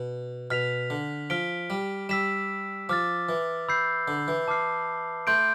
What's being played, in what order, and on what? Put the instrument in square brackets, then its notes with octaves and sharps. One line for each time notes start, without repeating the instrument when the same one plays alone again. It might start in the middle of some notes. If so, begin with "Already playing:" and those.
Already playing: [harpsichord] B2
[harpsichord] B2 [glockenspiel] F6 B6 F7
[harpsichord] D3
[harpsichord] F3 [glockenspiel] F6 B6 D7 G7
[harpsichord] G3
[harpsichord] G3 [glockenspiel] E6 B6 E7
[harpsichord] F3 [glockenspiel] D6 F6 A6
[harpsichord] E3
[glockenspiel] B5 E6 G6 C7
[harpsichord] D3
E3
[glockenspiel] A5 D6 F6 C7
[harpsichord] A3 [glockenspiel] C6 G6 D7